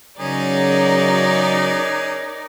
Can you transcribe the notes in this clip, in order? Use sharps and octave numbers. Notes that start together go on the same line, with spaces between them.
C#3 F#3 C#4 D#4 G#4 A#4 D5